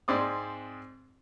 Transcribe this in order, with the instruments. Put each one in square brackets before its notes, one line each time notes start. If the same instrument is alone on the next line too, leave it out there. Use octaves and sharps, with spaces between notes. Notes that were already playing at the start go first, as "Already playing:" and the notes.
[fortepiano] G#2 G#3 C4 D5 D#6